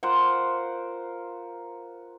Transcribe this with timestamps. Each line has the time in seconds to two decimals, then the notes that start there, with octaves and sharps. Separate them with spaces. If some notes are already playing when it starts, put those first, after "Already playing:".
0.03 F4 A#4 C5 F#5